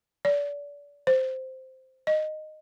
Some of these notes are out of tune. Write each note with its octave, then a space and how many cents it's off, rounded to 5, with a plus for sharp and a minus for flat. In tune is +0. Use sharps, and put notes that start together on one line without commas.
D5 -30
C5 -5
D#5 -10